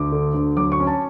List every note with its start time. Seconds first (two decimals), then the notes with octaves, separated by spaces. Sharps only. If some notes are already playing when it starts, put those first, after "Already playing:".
Already playing: D2 D6
0.12 D3
0.34 D2
0.57 F#3 D6
0.72 C#6
0.80 C#4
0.87 A5